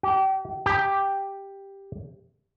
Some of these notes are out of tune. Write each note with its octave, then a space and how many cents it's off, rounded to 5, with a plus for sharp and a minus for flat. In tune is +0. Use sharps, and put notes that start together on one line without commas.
G4 -30
G4 +5